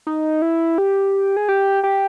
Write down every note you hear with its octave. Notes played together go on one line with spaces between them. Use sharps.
D#4
E4
G4
G#4
G4
G4